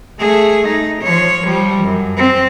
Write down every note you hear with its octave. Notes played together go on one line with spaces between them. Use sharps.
A3 G#4
D#4
F3 C#5
F3 G3
F#2
C4